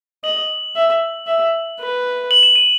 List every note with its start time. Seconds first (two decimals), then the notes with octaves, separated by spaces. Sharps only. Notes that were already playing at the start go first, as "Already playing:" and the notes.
0.24 D#5 F#7
0.76 E5
1.27 E5
1.80 B4
2.31 F#7
2.43 E7
2.56 D#7